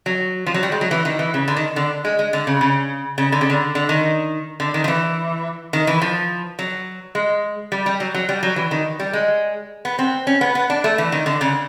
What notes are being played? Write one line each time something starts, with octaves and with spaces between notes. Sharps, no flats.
F#3
F3
F#3
G3
G#3
F#3
E3
D#3
E3
C#3
D3
D#3
D3
G#3
G#3
D3
C#3
C#3
C#3
D3
C#3
D3
D3
D#3
D3
D#3
F3
E3
D#3
E3
F3
F#3
G#3
G3
G3
F#3
F#3
G3
F#3
E3
D#3
G3
G#3
B3
C4
C#4
B3
B3
D4
A3
E3
D#3
D3
C#3